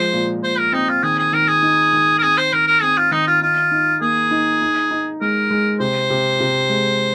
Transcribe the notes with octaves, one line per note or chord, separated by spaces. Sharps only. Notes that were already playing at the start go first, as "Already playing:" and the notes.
Already playing: F3 G#3 C5
A#2
A#2 C5
A#4
C4 D#4
F4
D#3 G#4
G#4
D#3 A#4
G#4
D#4
D#3
A#4
C4 G#4
C5
D#3 A#4
A#4
C4 G#4
F4
D#3 D#4
F4
D#4 F4
D#4
A#3 G#4
D#4
D#4
D#4
G#3 A#4
G#3
C3 C5
C3
C3
G#3